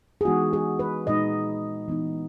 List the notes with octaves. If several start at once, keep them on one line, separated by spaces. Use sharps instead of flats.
G#4
E3 G#3 B3 D#4 F#4
G#4
B4
A#2 G#3 D#4 D#5
E3 B3 D#4